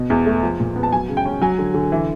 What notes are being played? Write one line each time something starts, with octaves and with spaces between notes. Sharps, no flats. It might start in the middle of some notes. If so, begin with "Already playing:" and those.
Already playing: B2
E2
A3
F3
A#2
B3
A5
F#3 G#5
C#3
G5
C#4
F#3 G#5
D3
D3
E3